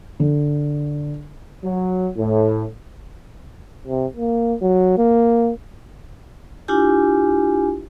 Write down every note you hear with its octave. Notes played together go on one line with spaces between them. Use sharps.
D3
F#3
A2
C3
A#3
F#3
A#3
D4 E4 F4 G4 G#5